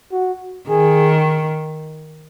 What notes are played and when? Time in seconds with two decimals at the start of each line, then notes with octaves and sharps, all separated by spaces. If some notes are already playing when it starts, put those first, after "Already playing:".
0.12 F#4
0.69 D#3 G#4